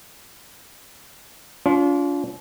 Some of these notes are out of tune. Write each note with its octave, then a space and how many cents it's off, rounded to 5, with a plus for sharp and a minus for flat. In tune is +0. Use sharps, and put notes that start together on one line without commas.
D4 -45 F4 +5